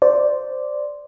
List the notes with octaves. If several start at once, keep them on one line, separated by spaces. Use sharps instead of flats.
C5 D5